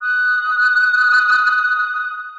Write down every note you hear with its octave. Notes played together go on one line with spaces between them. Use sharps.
D#6 F#6